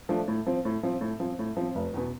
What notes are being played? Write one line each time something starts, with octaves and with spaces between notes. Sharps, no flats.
F3 A3 D4
A2
F3 C4
A2
F3 C4
A2
F3 C4
A2
F3 C4
F1
E2 B2 B3